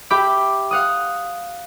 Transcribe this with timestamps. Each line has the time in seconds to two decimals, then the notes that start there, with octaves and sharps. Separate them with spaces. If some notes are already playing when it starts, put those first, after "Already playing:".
0.10 G4 E5 G5 B5 D6
0.71 F5 F#5 D#6